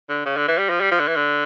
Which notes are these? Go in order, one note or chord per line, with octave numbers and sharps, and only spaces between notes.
D3
C#3
D3
E3
G3
F3
G3
F3
D3
E3
D3